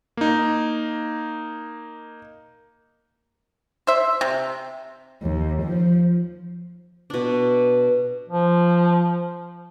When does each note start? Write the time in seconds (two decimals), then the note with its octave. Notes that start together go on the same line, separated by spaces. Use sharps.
0.17 A#3 D#4
3.87 C5 E5
4.21 C3
5.22 D#2
5.62 F3
7.10 B2 D4
8.29 F3